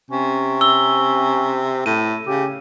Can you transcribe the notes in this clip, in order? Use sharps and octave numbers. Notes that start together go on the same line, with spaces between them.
C3 C#4
E6 G7
A2 D#7
C#3 G4